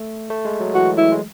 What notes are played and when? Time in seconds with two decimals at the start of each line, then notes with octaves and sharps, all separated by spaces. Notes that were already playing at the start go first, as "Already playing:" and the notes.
Already playing: A3
0.30 A3
0.45 G#3
0.60 F#3
0.75 E3 F#4
0.97 E4
1.12 G#3